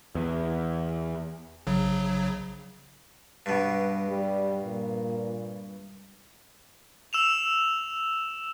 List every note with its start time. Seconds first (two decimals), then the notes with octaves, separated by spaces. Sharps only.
0.15 E2
1.67 A#1 C#3 F#3
3.46 G2 B2
4.09 G3
4.64 A#2
7.13 E6 E7 F7